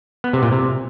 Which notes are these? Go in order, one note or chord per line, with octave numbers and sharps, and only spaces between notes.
B3
C3
A#2
C3